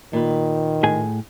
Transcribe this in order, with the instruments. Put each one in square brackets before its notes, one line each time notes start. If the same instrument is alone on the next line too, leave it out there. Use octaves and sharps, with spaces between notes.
[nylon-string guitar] A#2 B4 [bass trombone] D#3
[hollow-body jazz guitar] A2 G#4 G#5